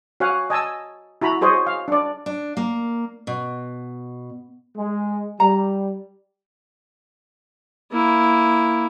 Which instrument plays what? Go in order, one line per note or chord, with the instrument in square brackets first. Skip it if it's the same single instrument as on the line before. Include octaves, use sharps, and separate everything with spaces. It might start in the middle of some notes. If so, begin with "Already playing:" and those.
[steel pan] F#4 C#5 F5 F#5 G#5
D#5 G#5 A5 E6
E4 F#4 A#5 B5
F#4 G#4 C5 C#5 D#5 G#5
F5
D4 D5
[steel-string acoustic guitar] D4
A#3
B2
[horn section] G#3
[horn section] G3 [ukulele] A#5
[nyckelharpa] A#3 E4